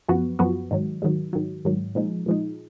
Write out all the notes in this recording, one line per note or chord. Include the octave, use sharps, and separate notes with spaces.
F#2 F3 B3 F#4
F#2 F3 B3 F#4
G#2 D#3 F#3
G#2 D#3 F#3
G#2 D#3 F#3
G#2 D#3 F#3
A#2 F3 G#3 D#4
A#2 F3 G#3 D#4